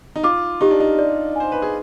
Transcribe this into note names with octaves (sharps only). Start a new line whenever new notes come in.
D#4
F4 D6
D#4 G4
D4
D#4
D5
C5 G#5
B4
G#4